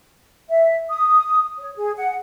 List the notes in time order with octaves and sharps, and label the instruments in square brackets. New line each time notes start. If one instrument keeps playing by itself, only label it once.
[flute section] E5
D#6
C#5
G#4
F#5